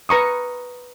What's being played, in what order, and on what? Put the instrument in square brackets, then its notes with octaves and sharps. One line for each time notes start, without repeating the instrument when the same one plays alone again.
[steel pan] B4 A#5 C#6 D#6